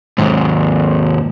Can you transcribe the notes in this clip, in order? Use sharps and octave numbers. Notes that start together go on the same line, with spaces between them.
D#2 G#2